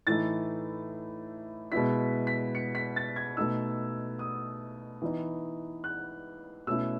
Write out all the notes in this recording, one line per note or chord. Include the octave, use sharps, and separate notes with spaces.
A2 E3 A3 D#4 A6
B2 G#3 B3 E4 B6
B6
C#7
B6
A6
G#6
B2 A3 D#4 E6
D#6
E3 B3 D#4
F#6
B2 A3 C#4 E4 E6